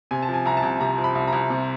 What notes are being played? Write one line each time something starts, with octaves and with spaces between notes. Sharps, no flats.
C3 G#5
A5
F3
G#5
C2 A#5
A5
C2
C3 A#5
F3
B5
C2
A#5
C2
C3